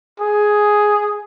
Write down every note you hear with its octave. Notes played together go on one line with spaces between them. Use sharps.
G#4